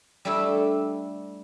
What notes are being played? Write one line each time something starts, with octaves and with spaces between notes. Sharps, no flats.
G3 A3 D4 E4 A4 E5